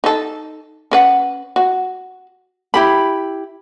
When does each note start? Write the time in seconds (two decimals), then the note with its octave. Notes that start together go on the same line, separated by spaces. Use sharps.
0.04 D#4 A4
0.91 C#4 B4 F#5
1.56 F#4
2.74 E4 G4 B5